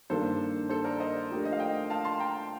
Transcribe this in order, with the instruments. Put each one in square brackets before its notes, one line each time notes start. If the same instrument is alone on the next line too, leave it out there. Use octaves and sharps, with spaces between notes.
[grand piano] G2 D#3 A#3 D4 [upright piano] A4 C5
[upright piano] A4 C5
A#4 D5
C5 D#5
[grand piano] F3 A3 D4 G4 A#4
[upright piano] D#5
F5
D#5 G5
F5 A5
A5 C6
G5 A#5